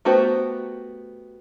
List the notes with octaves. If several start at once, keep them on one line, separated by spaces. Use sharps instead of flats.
A3 B3 F#4 G4 C5